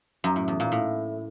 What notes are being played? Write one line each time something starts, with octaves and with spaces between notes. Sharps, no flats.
F#2
A2
E2
A#2
A2